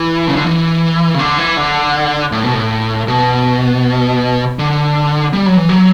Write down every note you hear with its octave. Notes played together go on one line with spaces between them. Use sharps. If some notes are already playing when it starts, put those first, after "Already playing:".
Already playing: E3
C#3
D3
E3
C#3
D3
E3
D3
A2
B2
A2
B2
D3
G3
F#3
E3
F#3